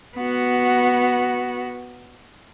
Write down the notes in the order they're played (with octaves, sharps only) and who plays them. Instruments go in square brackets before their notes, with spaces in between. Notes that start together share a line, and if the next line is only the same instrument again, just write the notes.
[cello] B3 F#4